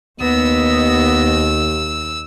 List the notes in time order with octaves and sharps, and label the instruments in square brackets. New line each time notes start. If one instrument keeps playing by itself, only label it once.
[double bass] D#2 [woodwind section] B3 D#5 [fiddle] E6